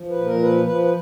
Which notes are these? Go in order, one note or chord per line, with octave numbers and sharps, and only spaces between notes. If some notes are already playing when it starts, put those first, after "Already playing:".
Already playing: F3
B4
A#2
A#4
F3 B4
F3 B4
B4